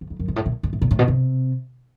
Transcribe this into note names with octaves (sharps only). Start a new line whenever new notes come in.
E2
F2
F#2
G#2
A2
A#2
G#2
A2
A#2
A2
B2
C3